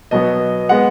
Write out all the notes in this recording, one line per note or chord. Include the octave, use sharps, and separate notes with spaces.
B2 F#3 B3 D#5
G#3 B3 F#5